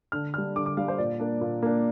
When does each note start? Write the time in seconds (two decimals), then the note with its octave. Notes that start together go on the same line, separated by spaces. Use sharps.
0.12 D3 F6
0.34 G3 D4 F6
0.56 D3 D6
0.66 D6
0.77 G3 D4 F5
0.88 C5
0.98 A#2 D5
1.20 A#3 D4
1.41 A#2
1.62 A#3 D4